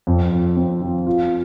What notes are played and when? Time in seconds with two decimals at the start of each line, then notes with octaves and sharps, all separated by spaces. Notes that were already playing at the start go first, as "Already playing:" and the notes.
0.07 F2
0.32 F2
0.57 C4
0.82 F3
1.07 F4